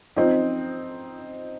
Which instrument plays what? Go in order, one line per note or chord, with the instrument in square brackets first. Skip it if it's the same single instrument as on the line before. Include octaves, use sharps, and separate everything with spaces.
[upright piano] F3 C4 D#4